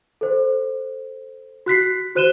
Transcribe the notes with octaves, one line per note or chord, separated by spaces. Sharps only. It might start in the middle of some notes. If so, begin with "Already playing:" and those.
A4 C5
F#4 F#6 B6 C7
F#4 C5 F#6 D#7 E7 G7